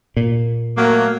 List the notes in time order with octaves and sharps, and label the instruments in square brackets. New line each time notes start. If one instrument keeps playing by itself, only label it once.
[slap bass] A#2
[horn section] F#3 A3 A#3